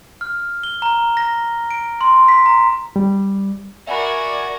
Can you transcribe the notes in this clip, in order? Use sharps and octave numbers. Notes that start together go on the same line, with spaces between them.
F6
G7
A#5
A#6
D7
C6
B6
A#5
G3
F#4 A#4 D5 E5 F#5 G#5 B5